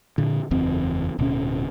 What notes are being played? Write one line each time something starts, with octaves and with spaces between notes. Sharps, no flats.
A#2 D3
F#1 E2 C4
D1 B2 C#4